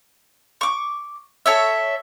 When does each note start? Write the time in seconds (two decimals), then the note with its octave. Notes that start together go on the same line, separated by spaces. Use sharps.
0.61 C#6 D6
1.46 A4 C#5 E5